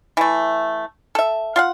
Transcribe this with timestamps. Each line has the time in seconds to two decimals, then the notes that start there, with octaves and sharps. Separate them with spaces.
0.17 E3 A3
1.15 A4 E5
1.56 F4 F5 F#5